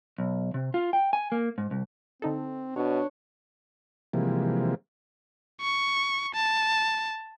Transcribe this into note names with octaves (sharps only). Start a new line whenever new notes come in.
B1
C3
F4
G5
G#5
A#3
G#2
C2
D3 C4 D#4 A4
B2 D4 C#5
C3 E3 F3 G3 G#3 A#3
C#6
A5